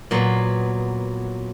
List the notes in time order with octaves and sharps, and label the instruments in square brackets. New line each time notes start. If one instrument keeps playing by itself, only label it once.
[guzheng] A#2 F#3 B3